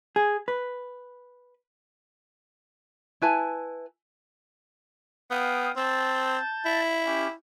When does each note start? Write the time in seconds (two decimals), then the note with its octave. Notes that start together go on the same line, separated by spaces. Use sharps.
0.16 G#4
0.48 B4
3.22 E4 B4 G#5 A5
5.31 B3 F5 G5 D#6
5.76 C4 A5 G6 A6
6.65 E4
7.06 C#4 G4